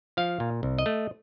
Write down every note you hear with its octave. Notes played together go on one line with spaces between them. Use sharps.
F3 F5
A#2
C2
D#5
A3